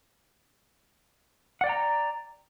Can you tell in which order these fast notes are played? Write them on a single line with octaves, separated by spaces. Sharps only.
F#5 D5 G5 A#5